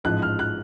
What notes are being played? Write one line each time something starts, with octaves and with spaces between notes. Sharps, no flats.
A1 G#2 F3 F#6
F6
F#6